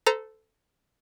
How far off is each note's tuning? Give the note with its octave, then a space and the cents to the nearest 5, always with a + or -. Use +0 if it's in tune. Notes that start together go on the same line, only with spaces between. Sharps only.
A4 +0 C5 -35 A#5 +0